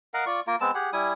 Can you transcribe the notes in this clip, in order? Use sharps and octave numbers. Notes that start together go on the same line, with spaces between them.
A#4 D#5 F5 F#5
F4 D5 C#6
A#3 F4 A#4
G#3 B3 C4 A5
G4 G#4 F#5
G3 E4 G#5 D#6